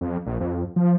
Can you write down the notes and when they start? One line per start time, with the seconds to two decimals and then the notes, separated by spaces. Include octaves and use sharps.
0.01 F2
0.26 A#1
0.40 F2
0.76 F3